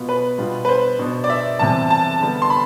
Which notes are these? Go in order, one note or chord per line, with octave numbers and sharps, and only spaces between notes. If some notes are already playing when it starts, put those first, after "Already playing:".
Already playing: B2 B3 F4
B4
B2 G3 D4 F4
B4
C5
B2 B3 D4
D5
E5
E2 C3 G3 A5
A5
D3 G3 B3
C6
B5